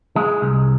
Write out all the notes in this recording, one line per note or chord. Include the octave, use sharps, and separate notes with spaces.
G#3
C2